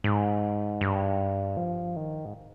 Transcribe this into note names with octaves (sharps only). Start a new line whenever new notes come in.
G#2
G2
F3
D#3
G#2